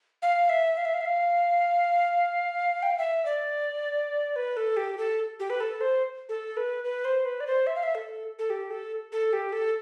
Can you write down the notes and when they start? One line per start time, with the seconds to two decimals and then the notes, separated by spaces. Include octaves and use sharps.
0.22 F5
0.49 E5
0.77 F5
0.85 E5
0.94 F5
1.01 E5
1.05 F5
2.83 G5
2.90 F5
2.98 E5
3.25 D5
4.36 B4
4.57 A4
4.77 G4
4.98 A4
5.40 G4
5.50 B4
5.60 A4
5.81 C5
6.29 A4
6.57 B4
6.84 B4
7.05 C5
7.25 B4
7.40 D5
7.47 C5
7.67 E5
7.75 F5
7.83 E5
7.95 A4
8.39 A4
8.50 G4
8.70 A4
9.12 A4
9.33 G4
9.52 A4